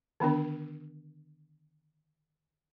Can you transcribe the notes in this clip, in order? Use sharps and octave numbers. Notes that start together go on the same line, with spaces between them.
D3 D#3 B3 D4